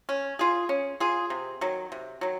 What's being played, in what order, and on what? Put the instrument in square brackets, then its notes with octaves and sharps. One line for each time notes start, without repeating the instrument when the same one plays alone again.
[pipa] C#4
F4 G#4
C#4
F4 G#4
C3
D#3 F#3
C3
D#3 F#3